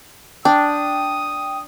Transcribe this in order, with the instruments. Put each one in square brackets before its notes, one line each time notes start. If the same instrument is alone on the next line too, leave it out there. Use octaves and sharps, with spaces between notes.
[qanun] D4 [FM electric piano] G5 [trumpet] D#6